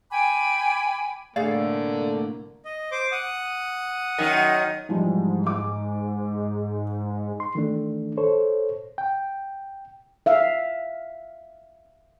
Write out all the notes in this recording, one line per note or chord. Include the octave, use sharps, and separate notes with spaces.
G5 G#5 B5 D6
C2 A2 D3 A3 A#3 G#4 D5 F5
D#5
C5 D6
F#5 D#6
F#2 D#3
G#2 E3 F3 G3
D6
C6
D#3 E3 A3 D4
A4 C5 C#5
G5
E5 F5